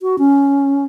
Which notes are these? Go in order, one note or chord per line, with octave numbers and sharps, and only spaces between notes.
F#4
C#4